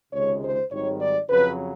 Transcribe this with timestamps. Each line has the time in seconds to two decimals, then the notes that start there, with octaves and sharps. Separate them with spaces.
0.13 C#2 C3 D#3 G#3 C#5
0.43 C5
0.72 G#1 G#2 D#3 G3 C#5
1.00 D5
1.30 F2 C#3 F#3 B4